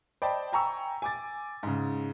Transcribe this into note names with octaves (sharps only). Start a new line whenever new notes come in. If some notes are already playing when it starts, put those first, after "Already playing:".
C5 D5 D#5 G5 A5 B5
G5 G#5 A#5 B5 C#6 E6
G#5 D6 A6
G#2 C#3